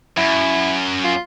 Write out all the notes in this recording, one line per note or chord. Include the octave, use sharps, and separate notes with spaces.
F#2 E4
F4